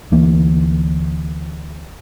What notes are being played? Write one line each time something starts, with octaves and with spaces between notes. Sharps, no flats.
D2 E3 A#3